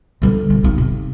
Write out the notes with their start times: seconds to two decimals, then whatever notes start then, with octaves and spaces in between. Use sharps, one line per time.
0.22 D3 G3
0.50 C3 C#4
0.63 C4 D#4
0.78 C3